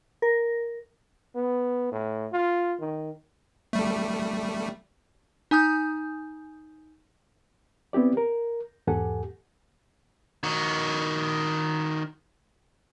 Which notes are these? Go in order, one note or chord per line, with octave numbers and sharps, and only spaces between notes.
A#4
B3
A2
F4
D#3
G3 A3
D#4 G#5 D#6 G6
B3 C4 E4 G4 D5
A#4
E2 G#2 G4 A4 F#5 G#5
D#3 F#4